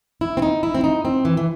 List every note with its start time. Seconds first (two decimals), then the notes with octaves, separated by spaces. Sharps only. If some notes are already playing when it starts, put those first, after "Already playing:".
0.21 E4
0.37 C4
0.42 D#4
0.63 E4
0.74 C4
0.84 D#4
1.05 C4
1.25 E3
1.37 E3